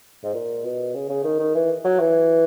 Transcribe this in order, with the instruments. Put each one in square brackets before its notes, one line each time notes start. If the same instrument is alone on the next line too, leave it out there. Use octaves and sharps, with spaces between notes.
[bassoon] G#2
A#2
B2
C#3
C#3
D#3
D#3
E3
F#3
E3